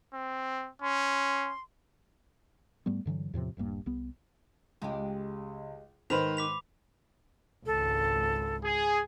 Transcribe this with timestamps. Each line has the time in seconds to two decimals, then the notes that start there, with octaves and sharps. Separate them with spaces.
0.14 C4
0.82 C#4 C6
2.86 G#2 G3 A3 B3
3.06 G2 D3 E3 F#3
3.34 E2 A2 C3 F3
3.57 D#1 A#1 G2 A#3
3.86 C2 B3
4.82 C#2 G#3 G4
6.10 G#2 D#3 B3 B4 C5 B5 F7
6.37 D6 B6 F7
7.66 G#1 C#2 A4
8.64 G#4